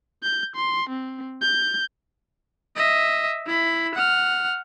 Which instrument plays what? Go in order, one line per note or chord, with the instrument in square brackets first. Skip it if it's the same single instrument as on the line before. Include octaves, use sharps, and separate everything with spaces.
[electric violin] G6
C6
C4
G6
D#5 E5
E4 B5
F#5 F6